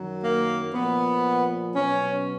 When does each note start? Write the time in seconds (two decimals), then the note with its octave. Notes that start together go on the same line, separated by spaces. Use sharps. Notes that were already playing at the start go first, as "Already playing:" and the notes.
Already playing: F#2 D#3 F#3
0.23 A#3
0.74 A#2 F3 B3
1.74 B2 F#3 C#4